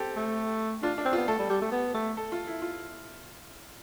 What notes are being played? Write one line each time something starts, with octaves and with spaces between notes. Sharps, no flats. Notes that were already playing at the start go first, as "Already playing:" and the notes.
Already playing: C4 G4 A4
A3
D4 F4
D4
C4
B3 F4
A3 A4
G3
G3
A3
B3
A3
A4
F4
E4
F4